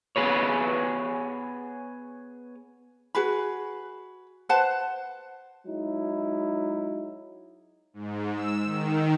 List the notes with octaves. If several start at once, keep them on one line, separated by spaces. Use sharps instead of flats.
B3 G#4 B4 C#5
F#4 G#4 B4 B5
B4 C5 F#5 A5
F#3 G#3 D#4 E4
G#2
E6
D#3